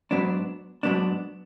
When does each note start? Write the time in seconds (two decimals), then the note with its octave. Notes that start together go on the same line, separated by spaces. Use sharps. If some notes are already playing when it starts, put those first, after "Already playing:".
0.11 G#2 F#3 B3 D4
0.83 G#2 F#3 B3 D4